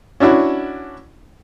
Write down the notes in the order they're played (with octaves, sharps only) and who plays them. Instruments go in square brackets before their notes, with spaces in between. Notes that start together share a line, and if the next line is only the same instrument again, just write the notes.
[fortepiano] C#4 D4 E4 F#4